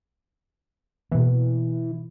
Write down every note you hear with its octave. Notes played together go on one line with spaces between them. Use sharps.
B2 E3 A#3